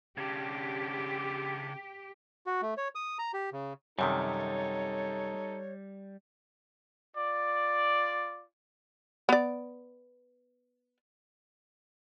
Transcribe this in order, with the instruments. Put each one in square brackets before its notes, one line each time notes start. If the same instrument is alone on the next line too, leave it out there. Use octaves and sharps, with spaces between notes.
[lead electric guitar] C#3 D4 [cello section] G4
[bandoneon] F#4
A3
C#5
D#6
A#5
G4
C#3
[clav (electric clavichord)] F#2 C3 D#3 [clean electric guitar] G3 [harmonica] D#4 A4 [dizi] C#5
[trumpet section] F4 D5
[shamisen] B3 D5